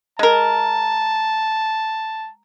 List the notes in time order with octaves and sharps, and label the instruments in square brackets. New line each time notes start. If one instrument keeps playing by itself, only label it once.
[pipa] G#3 A#4 [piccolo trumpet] A5